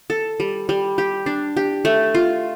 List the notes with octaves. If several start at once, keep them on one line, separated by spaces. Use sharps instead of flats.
A4
G3
G3
G4
D4
G4
A3
F4